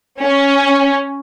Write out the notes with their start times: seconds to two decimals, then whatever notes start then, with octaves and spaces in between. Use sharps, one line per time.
0.20 C#4